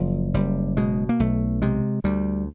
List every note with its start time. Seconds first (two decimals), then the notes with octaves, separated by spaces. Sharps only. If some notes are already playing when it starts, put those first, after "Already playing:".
Already playing: F#1 F3
0.34 F#1 G3
0.77 B2 G#3
1.09 A#3
1.20 B1 A3
1.62 C3 G#3
2.04 D2 G3